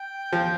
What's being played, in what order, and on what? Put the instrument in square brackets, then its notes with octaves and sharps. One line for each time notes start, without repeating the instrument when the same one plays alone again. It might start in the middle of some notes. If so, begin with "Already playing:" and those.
Already playing: [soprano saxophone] G5
[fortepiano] F3